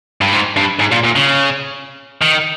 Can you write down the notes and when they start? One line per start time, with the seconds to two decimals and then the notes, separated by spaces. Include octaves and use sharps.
0.21 G2
0.33 G#2
0.57 G2
0.80 G#2
0.92 A#2
1.04 A#2
1.16 C#3
2.22 D#3